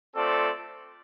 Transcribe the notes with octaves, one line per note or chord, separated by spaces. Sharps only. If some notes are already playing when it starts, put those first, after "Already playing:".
A3 C4 F4 A4 D5